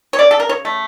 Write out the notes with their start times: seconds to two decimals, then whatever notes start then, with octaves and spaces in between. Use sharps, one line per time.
0.13 C#5
0.18 C#3 D5
0.31 A4
0.40 A#4
0.49 C#5
0.65 A3